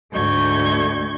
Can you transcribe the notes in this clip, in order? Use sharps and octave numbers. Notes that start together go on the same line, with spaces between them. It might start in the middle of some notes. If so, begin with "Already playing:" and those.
D2 G#2 A3 C#6 G6 G#6